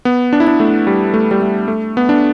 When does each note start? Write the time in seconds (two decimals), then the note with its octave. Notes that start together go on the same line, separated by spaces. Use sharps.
0.05 B3
0.33 D4
0.40 E4
0.47 D4
0.60 A3
0.87 G3
1.14 A3
1.31 G3
1.41 A3
1.68 A3
1.97 B3
2.09 D4